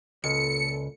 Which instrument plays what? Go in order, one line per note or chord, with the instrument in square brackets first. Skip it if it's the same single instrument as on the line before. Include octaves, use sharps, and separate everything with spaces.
[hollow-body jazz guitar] C#2 [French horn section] A#2 A4 [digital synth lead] C#7